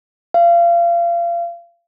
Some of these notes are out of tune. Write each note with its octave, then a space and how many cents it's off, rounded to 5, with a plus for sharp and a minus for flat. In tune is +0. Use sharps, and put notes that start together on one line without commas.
F5 -30